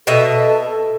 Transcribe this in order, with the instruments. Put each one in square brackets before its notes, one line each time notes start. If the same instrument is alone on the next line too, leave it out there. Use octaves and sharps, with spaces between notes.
[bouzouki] B2 D#5 E5 [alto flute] A4